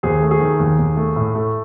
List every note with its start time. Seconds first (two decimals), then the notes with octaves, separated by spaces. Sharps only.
0.03 D#2 G#4 C5
0.22 A3
0.31 G#4
0.41 D#3
0.60 D#2
0.79 D#2
0.97 A3
1.16 A2
1.35 A3